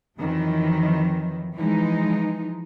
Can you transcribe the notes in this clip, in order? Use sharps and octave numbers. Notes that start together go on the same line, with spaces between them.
F2 D#3 E3 F#3
E3 F3 G#3 D#4